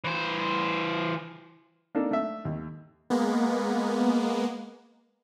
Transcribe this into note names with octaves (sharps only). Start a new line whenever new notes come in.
E3 C5
A#3 D4 D#4 A4
A3 E5
D#2
G#3 A#3 B3